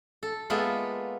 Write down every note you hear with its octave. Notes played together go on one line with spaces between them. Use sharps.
A4
G#3 A#3 B3 F4 A4 E5